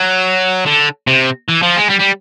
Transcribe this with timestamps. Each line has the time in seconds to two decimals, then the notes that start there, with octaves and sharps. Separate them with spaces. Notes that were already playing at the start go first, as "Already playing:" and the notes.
Already playing: F#3
0.66 D3
1.07 C3
1.49 E3
1.63 F3
1.77 G#3
1.90 G3
2.00 G3